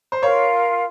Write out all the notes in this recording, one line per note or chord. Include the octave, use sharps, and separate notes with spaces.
C5
F4 A#4 C#5 F5